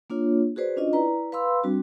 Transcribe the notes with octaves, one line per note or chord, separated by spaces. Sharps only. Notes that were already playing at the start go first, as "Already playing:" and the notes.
A#3 D4 F4 C#5
F#4 G#4 B4 C5 D5
C#4 D4 F4 D#5
E4 B4 D5 A#5
B4 F5 B5 C6 E6
G3 C4 D4 F#4